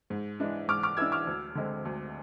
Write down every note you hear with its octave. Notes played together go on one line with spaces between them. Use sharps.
G#2
E3 G#3 D4
G#2 D6 F6
D6 F6
E3 G#3 D4 E6 G#6
D6 F6
D2
D3 G#3 C4
D2